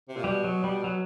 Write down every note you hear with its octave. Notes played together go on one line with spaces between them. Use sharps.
C3
A#2
B2 G3
F#3
G3
F#3